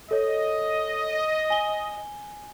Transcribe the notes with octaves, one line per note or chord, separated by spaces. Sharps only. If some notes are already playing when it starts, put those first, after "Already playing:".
A4 C#5 D#5
G#5 G7